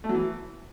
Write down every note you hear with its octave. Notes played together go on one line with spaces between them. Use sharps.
A3
F#3
E3